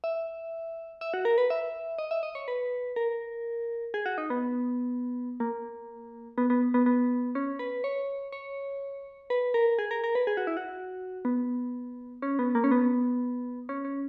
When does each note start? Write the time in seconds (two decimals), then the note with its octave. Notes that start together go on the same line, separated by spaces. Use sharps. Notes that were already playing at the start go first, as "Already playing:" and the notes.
0.04 E5
1.01 E5
1.14 F#4
1.25 A#4
1.38 B4
1.50 E5
1.98 D#5
2.11 E5
2.23 D#5
2.35 C#5
2.48 B4
2.96 A#4
3.94 G#4
4.06 F#4
4.18 D#4
4.30 B3
5.40 A#3
6.38 B3
6.50 B3
6.74 B3
6.86 B3
7.35 C#4
7.59 B4
7.84 C#5
8.32 C#5
9.30 B4
9.54 A#4
9.79 G#4
9.91 A#4
10.04 A#4
10.15 B4
10.27 G#4
10.37 F#4
10.47 E4
10.57 F#4
11.25 B3
12.22 C#4
12.39 B3
12.55 A#3
12.64 C#4
12.71 B3
13.69 C#4
13.85 C#4